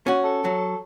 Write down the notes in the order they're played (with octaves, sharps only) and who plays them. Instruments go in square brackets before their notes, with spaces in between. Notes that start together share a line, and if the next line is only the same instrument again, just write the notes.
[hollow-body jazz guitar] C#4 F#4
[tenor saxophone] A4
[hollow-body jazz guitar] F#3